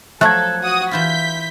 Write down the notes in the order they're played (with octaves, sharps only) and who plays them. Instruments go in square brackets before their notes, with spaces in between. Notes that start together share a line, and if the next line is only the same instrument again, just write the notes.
[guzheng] F3 F#3 A#5 [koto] A3 [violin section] A4 [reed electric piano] F#6 G#6
[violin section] F#4 F#5 D#6
[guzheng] E3 E4 F4 [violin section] G6 B6